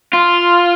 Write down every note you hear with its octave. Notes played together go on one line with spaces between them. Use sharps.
F4